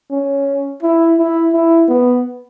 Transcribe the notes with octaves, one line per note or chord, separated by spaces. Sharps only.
C#4
E4
E4
E4
B3